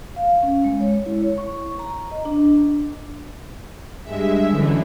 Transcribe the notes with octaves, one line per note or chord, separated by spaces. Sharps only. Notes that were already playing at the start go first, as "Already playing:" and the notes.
F5
C#4
G#3
C#5
E4
C#5
C#6
A#5
D#5
D4
G2 G#3 E5
F#2 D3 E3